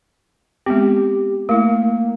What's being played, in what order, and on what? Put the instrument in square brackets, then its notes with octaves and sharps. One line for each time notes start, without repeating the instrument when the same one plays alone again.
[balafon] G#3 B3 C4 [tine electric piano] G4
[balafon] A3 E4 [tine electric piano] A#3